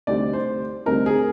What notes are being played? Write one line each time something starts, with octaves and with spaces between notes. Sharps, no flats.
D2 C3 G3 C4 D#4 D5
C5
D2 C3 G3 C4 D#4 A#4
G#4